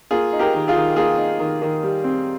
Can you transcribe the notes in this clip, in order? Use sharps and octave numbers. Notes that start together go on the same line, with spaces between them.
A#3 F4 G#4
D#4
G4 A#4
D#3
F4 G#4
D#3
A#3 F4 G#4
D#4
D#3
D#3
G3
C4